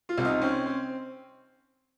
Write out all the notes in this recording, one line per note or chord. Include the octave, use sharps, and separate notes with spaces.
F4
C2
D#4
C4 C#4
C4